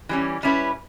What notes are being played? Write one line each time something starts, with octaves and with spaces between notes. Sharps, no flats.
E3 G3 C#4
G3 C#4 E4 B4